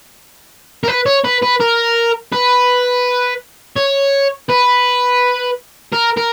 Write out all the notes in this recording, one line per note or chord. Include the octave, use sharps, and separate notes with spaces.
A#4
B4
C#5
B4
B4
A#4
B4
C#5
B4
A#4
A#4